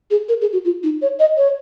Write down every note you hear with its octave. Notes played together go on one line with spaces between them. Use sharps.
G#4
A#4
G#4
F#4
F4
D#4
C#5
D#5
C#5